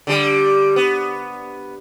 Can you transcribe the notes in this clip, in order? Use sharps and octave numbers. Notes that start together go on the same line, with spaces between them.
D3 G3
B3